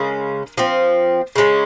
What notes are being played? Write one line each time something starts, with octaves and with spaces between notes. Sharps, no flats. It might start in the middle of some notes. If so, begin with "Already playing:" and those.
Already playing: C#3 G#3 C#4 A#4
F3 C4
C#3 G#3 C#4